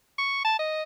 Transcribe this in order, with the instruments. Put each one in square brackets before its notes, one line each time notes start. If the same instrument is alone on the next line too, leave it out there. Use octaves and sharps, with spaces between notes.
[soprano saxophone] C#6
A5
D#5